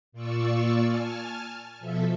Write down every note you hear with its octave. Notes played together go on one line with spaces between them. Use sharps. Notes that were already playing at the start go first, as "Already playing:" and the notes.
A#2 F4 D5 C#6 E6
G#5 A5 F6
B2 F3 A4 E5